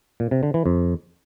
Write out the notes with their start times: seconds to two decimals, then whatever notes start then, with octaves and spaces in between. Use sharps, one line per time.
0.20 A#2
0.31 C3
0.43 D3
0.54 E3
0.66 F2